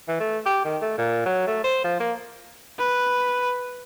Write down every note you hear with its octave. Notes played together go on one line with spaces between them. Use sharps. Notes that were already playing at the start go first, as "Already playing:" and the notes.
E3
A3
G4
D#3
A3
A#2
F#3
A3
C5
F3
A#3
B4